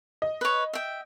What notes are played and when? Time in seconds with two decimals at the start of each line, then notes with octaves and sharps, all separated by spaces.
0.22 D#5
0.41 B4 C#5
0.73 E5 G5